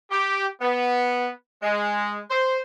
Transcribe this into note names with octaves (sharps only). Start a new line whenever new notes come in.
G4
B3
G#3
C5